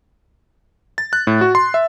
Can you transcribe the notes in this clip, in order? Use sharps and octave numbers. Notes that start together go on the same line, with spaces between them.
A6
F#6
A2
F#4
C6
E5